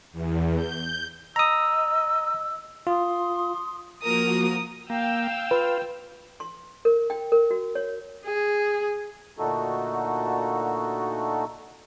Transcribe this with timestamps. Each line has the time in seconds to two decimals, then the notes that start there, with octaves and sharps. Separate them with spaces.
0.13 E2
0.56 G6
1.36 D#5 A#5 D#6 E6
2.87 F4 C6 D#6
4.03 F3 A#3 F#4 A#4 D#6
4.90 A#3 F5 G5 E6
5.51 F4 B4
6.40 C6
6.85 A#4
7.10 G5
7.32 A#4
7.51 F#4
7.75 C#5
8.26 G#4
9.38 A#2 D3 A3 D#4 F#4 A4